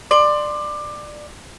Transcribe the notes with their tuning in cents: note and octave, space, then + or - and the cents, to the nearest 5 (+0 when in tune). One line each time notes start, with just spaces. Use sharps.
D5 +20 C6 +0